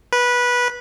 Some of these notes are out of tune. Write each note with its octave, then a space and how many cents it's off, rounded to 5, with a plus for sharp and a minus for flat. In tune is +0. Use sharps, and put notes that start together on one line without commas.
B4 -15